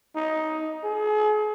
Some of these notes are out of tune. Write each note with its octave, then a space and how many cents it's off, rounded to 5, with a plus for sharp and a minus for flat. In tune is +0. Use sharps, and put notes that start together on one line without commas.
D#4 +10
G#4 +40